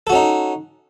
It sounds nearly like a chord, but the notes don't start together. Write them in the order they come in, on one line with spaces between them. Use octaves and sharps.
A4 F#4 C#4 D#4